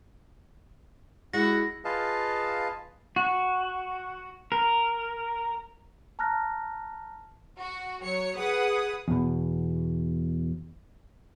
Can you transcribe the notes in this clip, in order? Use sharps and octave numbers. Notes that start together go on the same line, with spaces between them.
G#3 E4 F#4 A#6
F4 G#4 B4 D#5 F5 A5
F#4
A#4
A5 A#5 F6 F#6 A#6
F#4
F#3 C#5 C#7
G#4 B4 F#5 D#6
E2 B2